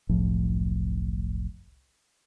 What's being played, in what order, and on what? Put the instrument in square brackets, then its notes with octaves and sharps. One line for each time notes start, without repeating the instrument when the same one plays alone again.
[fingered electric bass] F#1 C2 A2 F3